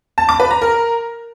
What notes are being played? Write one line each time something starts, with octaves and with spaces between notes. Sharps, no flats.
A5
D6
B4
A#5
A#4